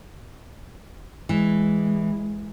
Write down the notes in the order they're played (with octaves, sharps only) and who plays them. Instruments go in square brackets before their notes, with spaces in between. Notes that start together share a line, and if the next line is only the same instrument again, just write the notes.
[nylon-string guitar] E3 [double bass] G#3